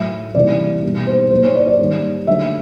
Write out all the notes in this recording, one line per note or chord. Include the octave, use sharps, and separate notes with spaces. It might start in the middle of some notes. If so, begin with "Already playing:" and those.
Already playing: A2 F#3 A3 E5
C3 E3 G3 A#3 D5
B2 G3 A#3
C5
A#2 F#3 A#3 C5
C#5
D5
D5
D#3 G3 A#3
D3 F#3 A3 E5